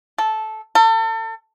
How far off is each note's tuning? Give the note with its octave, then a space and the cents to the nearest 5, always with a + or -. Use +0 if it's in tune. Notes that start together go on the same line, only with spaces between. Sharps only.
A4 -10
A4 +35